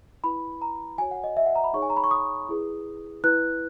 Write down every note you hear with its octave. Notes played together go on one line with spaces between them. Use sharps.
E4 B4 B5
A#5
F#4 C#5 G#5
F#5
D#5
E5
F#5
A#5
B5
D#4 G#4 C#5 C#6
G#5
A#5
B5
C#6
D#6
E4 G#4 B4
E4 B4 F#6